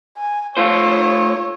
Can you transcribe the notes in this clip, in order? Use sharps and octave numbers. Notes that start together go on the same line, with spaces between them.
G#5
A3 F4 C5 C#5